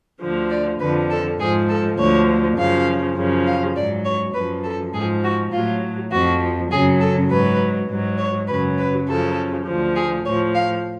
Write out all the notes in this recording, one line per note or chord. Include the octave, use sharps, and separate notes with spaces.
D2 D3 F3
D5
F2 D3 F3 B4
A4
G#2 F3 G#4
A4
D2 D3 F3 C#5
F#2 C#3 F3 F5
F#2 C#3 F3
F5
G#2 F#3 D5
C#5
F#2 F3 B4
A4
G#2 F3 G#4
F#4
A2 F#3 F4
F2 F3 F#4
F#2 C#3 F#3 G#4
A4
G#2 F#3 B4
G#2 F#3
C#5
F#2 C#3 F#3 B4
B4
F#2 C#3 F3 A4
D2 D3 F3
G#4
A2 F3 C#5
F5